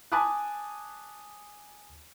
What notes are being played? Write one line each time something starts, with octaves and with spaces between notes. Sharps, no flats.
G#5 A5 B5 D6 D#6 F#6